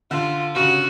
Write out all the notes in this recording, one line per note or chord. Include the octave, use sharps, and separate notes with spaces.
D3 F4
C#3 F#4